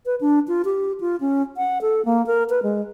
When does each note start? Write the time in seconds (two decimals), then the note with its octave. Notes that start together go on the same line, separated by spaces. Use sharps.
0.06 B4
0.21 D4
0.48 F4
0.65 G4
1.00 F4
1.21 C#4
1.57 F#5
1.81 A4
2.05 A#3
2.27 A#4
2.50 B4
2.63 G#3